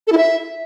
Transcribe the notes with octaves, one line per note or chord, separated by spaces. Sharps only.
A4
E4
E5